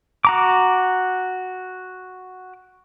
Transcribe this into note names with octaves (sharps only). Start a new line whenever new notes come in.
F#4 A#5 D6